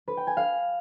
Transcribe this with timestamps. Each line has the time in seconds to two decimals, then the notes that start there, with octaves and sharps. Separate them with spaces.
0.08 B4
0.17 G5
0.27 G#5
0.37 F5